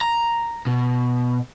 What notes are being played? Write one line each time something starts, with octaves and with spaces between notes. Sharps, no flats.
A#5
B2